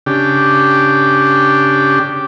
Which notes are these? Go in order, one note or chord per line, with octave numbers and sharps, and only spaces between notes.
C#3 D4 G4